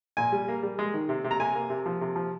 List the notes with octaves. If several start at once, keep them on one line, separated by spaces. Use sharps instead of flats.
A#2 G#5
G3
A#3
G3
G#3
D#3
C3
C3
A#5
C3 G#5
A#3
C3
F3
C3
F3